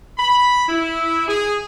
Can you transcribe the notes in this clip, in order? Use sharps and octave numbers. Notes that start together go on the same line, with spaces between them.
B5
E4
G#4